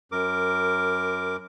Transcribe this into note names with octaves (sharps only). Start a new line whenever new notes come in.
F#2 A#4 D6